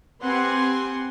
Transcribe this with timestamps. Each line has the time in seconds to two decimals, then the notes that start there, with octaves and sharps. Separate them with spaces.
0.22 C4 G4 B4 F#5 G#5 C6